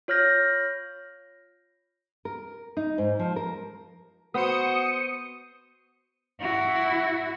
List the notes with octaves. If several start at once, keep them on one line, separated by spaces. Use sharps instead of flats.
F4 C#5 F6 G6 A#6
A#4
D#4
G#2
F3
A#4
B3 F#4 C5 D#6 C#7
E4 F#4